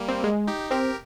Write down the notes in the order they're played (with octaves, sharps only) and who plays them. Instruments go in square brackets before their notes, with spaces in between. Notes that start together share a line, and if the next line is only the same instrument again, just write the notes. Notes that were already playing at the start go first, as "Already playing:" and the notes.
Already playing: [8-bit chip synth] G3 A#3
[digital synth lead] C4
G#3
[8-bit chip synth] D#4 G4
[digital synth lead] C4 [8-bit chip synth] G4 A#4